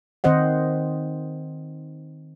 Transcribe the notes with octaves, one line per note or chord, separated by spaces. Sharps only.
D#3 C4 C5 D#5 F#5